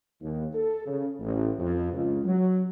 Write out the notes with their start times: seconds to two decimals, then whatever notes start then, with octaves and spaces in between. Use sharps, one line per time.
0.21 D#2
0.53 A4
0.86 C#3
1.20 A1
1.58 F2
1.93 C#2
2.25 F#3